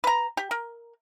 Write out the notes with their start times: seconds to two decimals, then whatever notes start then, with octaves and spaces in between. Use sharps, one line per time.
0.04 B4 A#5
0.37 G4
0.51 A#4